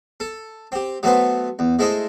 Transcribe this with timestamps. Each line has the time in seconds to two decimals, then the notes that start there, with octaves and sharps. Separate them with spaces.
0.20 A4
0.72 C4 G4
1.03 F#3 A3 B3 B4 C5
1.59 E2
1.79 G#3 A3 E4 C5 D#5